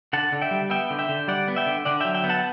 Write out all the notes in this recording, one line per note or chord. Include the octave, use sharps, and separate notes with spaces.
D3 F#5 A5
D3
E5 G5
G3
B3 E5 G5
D3
E5 G5
D3
G3 D5 F#5
B3
E5 G5
D3
D3 D5 F#5
F#3 E5 G5
E5 G5
B3
F#5 A5